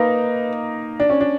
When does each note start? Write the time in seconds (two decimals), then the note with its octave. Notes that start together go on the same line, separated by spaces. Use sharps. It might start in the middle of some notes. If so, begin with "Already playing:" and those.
Already playing: A#3 D#4 B4
1.00 D4
1.10 C#4
1.21 D4